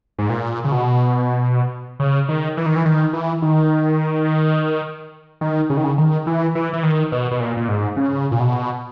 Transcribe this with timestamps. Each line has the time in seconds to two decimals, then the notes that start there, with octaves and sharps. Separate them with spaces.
0.19 G#2
0.29 A#2
0.64 C#3
0.72 B2
2.00 C#3
2.29 D#3
2.57 E3
2.66 D#3
2.76 E3
2.85 D#3
3.13 E3
3.42 D#3
5.41 D#3
5.70 C#3
5.77 D#3
5.84 C#3
5.98 D#3
6.27 E3
6.55 E3
6.73 E3
6.83 D#3
7.12 B2
7.31 B2
7.40 A#2
7.57 A#2
7.68 G#2
7.96 C#3
8.31 A#2
8.40 B2